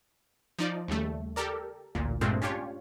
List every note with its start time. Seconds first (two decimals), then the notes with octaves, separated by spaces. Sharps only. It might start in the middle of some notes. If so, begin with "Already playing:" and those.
0.59 F3 D#4 D5
0.88 D#2 C#3 G3 A3
1.36 G4 A4 A#4 D5
1.95 A1 D2 A#2
2.21 G2 A#2 G#3 A3 C4 F4
2.42 C#4 D4 F4 G4 C#5